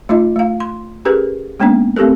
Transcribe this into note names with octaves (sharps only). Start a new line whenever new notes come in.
A3 D#4 F4 D#5
A3 F5
C6
C#4 G4 G#4 A#4 B4
G#3 A#3 B3 C#4 D4
A3 C4 G4 A4 A#4